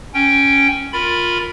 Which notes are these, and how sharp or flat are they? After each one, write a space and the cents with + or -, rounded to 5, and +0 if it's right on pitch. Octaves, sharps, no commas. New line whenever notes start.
C#4 +0 G5 +0
F4 +15 A#4 +0 B5 +0